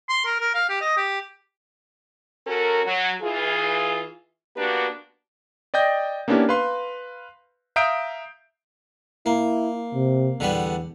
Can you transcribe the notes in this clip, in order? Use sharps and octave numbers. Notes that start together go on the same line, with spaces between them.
C6
A#4
A#4
F5
G4
D#5
G4
C#4 F#4 A4 A#4
F#3
E3 F4 G#4
A#3 B3 D4 F#4 G4 B4
D5 D#5 G5 G6 A#6
A#3 B3 C#4 D4 E4 G4
B4 F5 C6
E5 F5 A#5 D#6 G6 D7
A#3 E4
C3
E2 D3 G3 B3